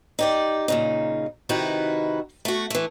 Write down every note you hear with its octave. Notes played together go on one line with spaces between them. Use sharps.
D#4 G4 D5
A#2 C#3 D#4
C3 D#3 D#4 E4 F#4 B4
A3 F#4
E3 A3